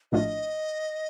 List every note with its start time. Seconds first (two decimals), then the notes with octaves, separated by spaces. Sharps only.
0.12 A#1 A2 A3 D4 F4 D#5